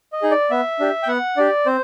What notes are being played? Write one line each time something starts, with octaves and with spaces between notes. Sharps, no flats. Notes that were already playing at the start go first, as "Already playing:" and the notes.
D#5
D#4 G#4
D5
B3 E5
D4 G4
G5
B3 F#5
D4 G4 D5
C4 C5